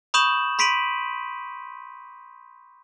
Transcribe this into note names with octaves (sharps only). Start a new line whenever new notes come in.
B5 C#6 D#6 G6 E7 F#7
B5 C6 B6 D7 D#7 F#7